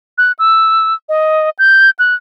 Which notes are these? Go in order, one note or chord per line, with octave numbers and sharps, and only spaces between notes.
F#6
E6
D#5
G6
F#6